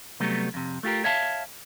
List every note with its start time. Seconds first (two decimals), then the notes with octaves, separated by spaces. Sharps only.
0.20 C3 F#3 G3 A3 B3
0.54 F2 C3
0.83 A3 F4 G4 A#4
1.04 C#5 E5 F5 A5